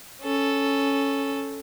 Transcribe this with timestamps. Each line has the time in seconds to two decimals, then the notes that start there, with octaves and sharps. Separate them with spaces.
0.22 C#4 A4